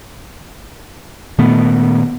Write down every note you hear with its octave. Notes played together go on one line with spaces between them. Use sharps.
A#2 D#3 A3 B3